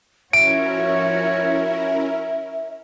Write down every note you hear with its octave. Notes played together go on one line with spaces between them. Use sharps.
F3 C#4 E4 F#4 A#4 C#5 E5 D7